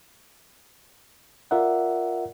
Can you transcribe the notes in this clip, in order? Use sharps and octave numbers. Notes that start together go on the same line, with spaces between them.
F4 A#4 D5 E5 F#5